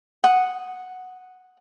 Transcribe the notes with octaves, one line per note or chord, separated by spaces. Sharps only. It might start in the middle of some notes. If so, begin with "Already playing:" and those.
F#5 D#6